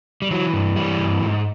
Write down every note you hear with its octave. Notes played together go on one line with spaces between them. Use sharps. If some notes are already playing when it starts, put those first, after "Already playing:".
G3
E3 F#3
G2
E3 G3
G2
G#2